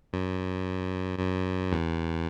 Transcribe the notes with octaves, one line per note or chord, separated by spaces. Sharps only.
F#2
F#2
E2